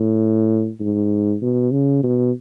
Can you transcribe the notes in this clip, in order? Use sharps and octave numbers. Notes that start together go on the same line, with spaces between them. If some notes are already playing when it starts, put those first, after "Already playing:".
Already playing: A2
G#2
B2
C#3
B2